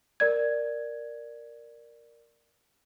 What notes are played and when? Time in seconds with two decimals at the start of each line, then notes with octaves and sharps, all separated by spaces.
0.20 A#4 D5 G#6